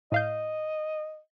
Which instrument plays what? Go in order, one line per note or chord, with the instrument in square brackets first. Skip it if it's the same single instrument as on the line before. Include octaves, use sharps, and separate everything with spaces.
[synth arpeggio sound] A2 F5 G6 [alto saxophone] D#5